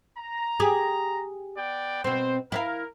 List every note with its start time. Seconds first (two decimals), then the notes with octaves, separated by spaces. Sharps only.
0.18 A#5
0.60 G4 G#4
1.57 B3 D5 G5
2.04 B2 C4 C5
2.52 E4 A#4 C5 F5